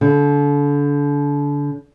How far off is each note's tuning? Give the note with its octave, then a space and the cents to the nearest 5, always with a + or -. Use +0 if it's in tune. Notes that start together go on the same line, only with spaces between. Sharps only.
D3 -30